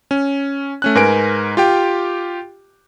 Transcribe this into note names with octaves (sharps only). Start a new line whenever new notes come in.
C#4
A3 C#4 F#6
G#2 A#4 B4 G#5 D7
F4 G4 G5